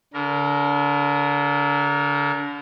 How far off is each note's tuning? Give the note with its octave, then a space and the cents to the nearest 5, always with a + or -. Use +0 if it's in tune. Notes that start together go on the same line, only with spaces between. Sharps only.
D3 -35 A#4 +0